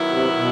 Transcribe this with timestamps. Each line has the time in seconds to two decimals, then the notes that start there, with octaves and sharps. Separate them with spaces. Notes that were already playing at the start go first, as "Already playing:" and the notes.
Already playing: D#3 F#3 B3 E4
0.10 C3
0.36 B2